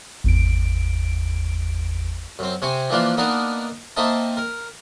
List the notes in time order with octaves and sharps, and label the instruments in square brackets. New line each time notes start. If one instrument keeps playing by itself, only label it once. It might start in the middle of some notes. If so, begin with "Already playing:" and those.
[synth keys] G#1 E2 D7
[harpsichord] F#2 C4
C3 C4 G#5 C#6
E3 F3 A#3 D4 F4
A#3 B3 D4 D#4 A#4
A#3 C4 D#4 D#5 E5 A5
A#4